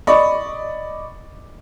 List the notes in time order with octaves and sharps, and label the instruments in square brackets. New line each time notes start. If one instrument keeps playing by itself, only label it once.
[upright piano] D5 D#5 B5 C#6